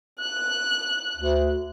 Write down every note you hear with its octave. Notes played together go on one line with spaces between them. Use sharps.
F#6
D2